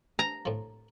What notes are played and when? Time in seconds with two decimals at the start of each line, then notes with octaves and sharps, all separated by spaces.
0.19 A#5
0.45 A2 F3